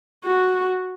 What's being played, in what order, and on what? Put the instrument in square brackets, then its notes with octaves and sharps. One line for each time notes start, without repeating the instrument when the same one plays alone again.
[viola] F#4